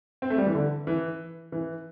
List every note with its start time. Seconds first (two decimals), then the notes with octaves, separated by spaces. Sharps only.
0.22 C4
0.30 A3
0.38 G3
0.46 E3
0.55 D3
0.87 E3
1.52 E3